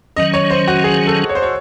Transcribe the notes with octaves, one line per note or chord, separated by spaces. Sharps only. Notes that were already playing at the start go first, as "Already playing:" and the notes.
D#3 F#3 C#4 D#5
C#5
C5
F#4
G#4
A4
C#5
C5
C#5